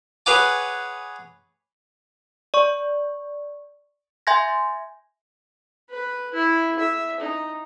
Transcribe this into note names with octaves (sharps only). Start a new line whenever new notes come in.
G#4 B4 C#5 F#5 G#5 D6
D5 C#6
E5 G#5 C6 G6 G#6 A#6
B4
E4
E5
D#4